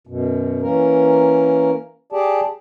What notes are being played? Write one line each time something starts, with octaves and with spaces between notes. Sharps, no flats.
F#2 B2
E3 A#3 C#4 A#4
G4 G#4 D5 A5